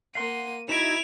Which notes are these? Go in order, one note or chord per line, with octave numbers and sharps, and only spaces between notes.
A#3 F5 F#5 C6 D#7
D#4 E4 F#4 G#6 D7 E7 F7